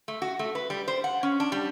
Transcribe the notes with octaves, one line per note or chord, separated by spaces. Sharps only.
A3
F#4
A3
B4
G3
C5
F#5
C#4
D4
G3